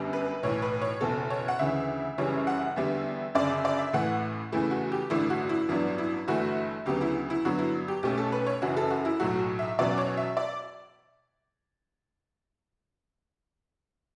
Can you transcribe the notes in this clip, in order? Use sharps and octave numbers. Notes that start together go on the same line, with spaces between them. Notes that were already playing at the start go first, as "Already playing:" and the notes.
Already playing: G1 F#2 D3 G3 B3
B4
B1 A2 E3 C#5
B4
C#5
F#1 E2 B2 A4
C#5
F#5
D2 C#3 E3 E5
F#1 F#2 C#3 E3 G3 C#5
F#5
E2 D3 G3 B3 E5
G1 F#2 C#3 D5
E5
D5
E5
A1 A2 E3 A3 F#5
E2 C#3 E3 A3 E4
F#4
G4
A1 G2 D3 A3 E4
F#4
E4
A1 G2 F#3 B3 D4 E4
E4
G1 G2 E3 A3 F#4
D2 C#3 F#3 B3 G4
E4
E4
G2 D3 F#3 B3 F#4
E4
G4
B1 B2 A3 C#4 G4
A4
B4
C#5
F#1 F#2 E3 F#4
A4
F#4
E4
B1 A2 F#3 A3 F#4
E5
E2 B2 F#3 C#4 D5
C#5
E5
D5